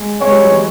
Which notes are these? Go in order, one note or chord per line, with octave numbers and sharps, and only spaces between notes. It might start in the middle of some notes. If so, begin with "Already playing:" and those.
Already playing: G#3
G#3 C#5
G3
F#3
E3